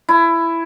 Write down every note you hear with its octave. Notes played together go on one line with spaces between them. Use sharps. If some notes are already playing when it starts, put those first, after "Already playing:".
E4